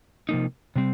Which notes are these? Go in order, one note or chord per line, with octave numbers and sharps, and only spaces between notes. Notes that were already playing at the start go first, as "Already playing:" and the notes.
C3 F3 A#3 D#4
C3 G3 C4